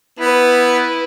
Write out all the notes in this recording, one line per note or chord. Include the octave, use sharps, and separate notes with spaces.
B3 E4 B4